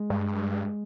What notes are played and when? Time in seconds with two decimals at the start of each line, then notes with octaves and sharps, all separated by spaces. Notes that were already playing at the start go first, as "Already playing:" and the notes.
Already playing: G#3
0.10 G2